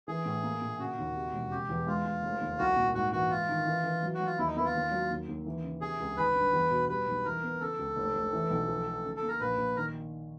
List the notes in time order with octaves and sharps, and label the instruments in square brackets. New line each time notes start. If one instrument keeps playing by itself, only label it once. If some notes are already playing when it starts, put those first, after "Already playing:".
[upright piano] E3 [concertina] G#4
[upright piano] A2
A#3
A#2
[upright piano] C#3 [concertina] F#4
[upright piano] D#2
C3
E1
[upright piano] C#3 [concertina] G4
[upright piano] E2
[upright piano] G#3 [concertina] F4
[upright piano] G#3
F1
D#2
[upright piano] C2 [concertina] F#4
[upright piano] A#2
[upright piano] G#2 [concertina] F#4
[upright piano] E3 [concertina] F#4
[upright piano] G#3 [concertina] F4
[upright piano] D#3
E3
E3
F#3
[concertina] F#4
[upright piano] F#3
[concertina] F4
[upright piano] D#2 [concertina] E4
[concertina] D#4
[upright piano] B3 [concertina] E4
[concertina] F4
[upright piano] D#2
F#3
D#2
D#2
E3
C#3
[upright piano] C3 [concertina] G#4
[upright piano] C#2
[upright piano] G#1 [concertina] B4
[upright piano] G2
E2
B2
[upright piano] G3 [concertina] B4
[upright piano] B1
[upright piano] E3 [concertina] A#4
[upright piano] B3
[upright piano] C#3 [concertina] A4
[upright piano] C#2
F1
F1
E3
B1
F3
A3
C#3
[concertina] A4
[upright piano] A#3
[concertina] A#4
[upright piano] A#1 [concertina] B4
[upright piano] A#1
[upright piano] D#3 [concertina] A#4